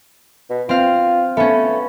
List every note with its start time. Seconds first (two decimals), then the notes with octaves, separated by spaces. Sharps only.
0.50 B2
0.69 C4 F4 F5
1.37 A3 B3 C#4